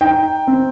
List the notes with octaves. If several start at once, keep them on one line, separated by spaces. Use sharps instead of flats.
D#4 G5
C4